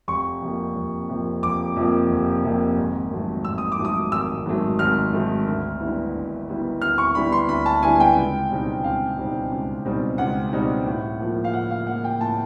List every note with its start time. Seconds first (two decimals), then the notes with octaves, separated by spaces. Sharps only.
0.08 F1 C#6
0.41 F2 C3 F3 A#3
0.75 F1
1.09 F2 C3 F3 A#3
1.43 F1 D6
1.76 F2 C3 F3 A#3
2.10 F1
2.44 F2 C3 F3 A#3
2.77 G#1
3.11 G#2 D#3 F#3 A3
3.45 G#1 E6
3.58 D#6
3.72 D6
3.79 G#2 D#3 F#3 A3
3.85 D#6
4.12 G#1 E6
4.46 G#2 D#3 F#3 A3
4.79 G#1 F6
5.13 G#2 D#3 F#3 A3
5.47 D2
5.80 D3 G3 B3 E4
6.15 D2
6.48 D3 G3 B3 E4
6.82 D2 F6
6.98 C#6
7.15 D3 G3 B3 E4 B5
7.32 C6
7.49 D2 B5
7.66 A5
7.83 D3 G3 B3 E4 G#5
7.95 G#5
8.00 G5
8.16 C#2
8.51 B2 G3 C4 D#4
8.84 C#2 F5
9.17 B2 G3 C4 D#4
9.52 C#2
9.85 B2 G3 C4 D#4
10.18 C#2 F#5
10.53 B2 G3 C4 D#4
10.86 A2
11.20 F3 A#3
11.44 F5
11.53 A2 F#5
11.71 F5
11.87 F3 A#3 F#5
12.04 G5
12.21 A2 A5